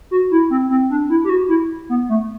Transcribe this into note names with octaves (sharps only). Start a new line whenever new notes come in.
F#4
E4
C4
C4
D4
E4
G4
F#4
E4
B3
A3